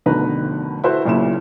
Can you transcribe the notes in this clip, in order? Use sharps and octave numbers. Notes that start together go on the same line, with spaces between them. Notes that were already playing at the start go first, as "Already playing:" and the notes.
F1 B2 D3 D#3 B4 A#5
E4 F#4 A4 B4 C5 E5
B1 A#2 C#3 E4 E7